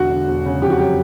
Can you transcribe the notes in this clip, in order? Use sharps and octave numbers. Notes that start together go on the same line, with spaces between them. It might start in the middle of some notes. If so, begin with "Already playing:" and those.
Already playing: E1 D3 F#4
D3
E1
C#3
F2 G4
F#4
F#3 G4